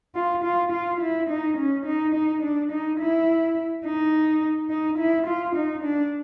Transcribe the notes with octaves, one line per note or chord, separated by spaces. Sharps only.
F4
F4
F4
E4
D#4
C#4
D#4
D#4
D4
D#4
E4
D#4
D#4
E4
F4
D#4
D4